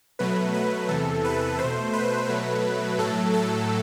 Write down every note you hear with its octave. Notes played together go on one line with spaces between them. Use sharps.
B2 F#3 A3 B4
B4
E2 C3 E3 A4
B4
A3 C5
B2
B4
B2 F#3 A3
A2 F#3 A3 A4
A4